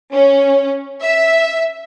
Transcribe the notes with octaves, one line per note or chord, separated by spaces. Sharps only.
C#4
E5